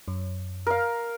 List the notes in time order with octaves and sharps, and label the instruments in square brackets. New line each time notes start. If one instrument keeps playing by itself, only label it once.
[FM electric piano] F#2
[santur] A#4 F5